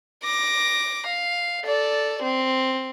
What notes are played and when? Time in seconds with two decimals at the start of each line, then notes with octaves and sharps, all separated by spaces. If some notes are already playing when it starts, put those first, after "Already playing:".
0.23 D6 A#6
1.06 F5
1.65 A4 D5
2.22 C4